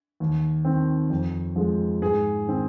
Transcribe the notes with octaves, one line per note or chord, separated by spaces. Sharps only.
D#2
D#3 C4
F2
F3 G#3
G#2 G#4
D#3 C4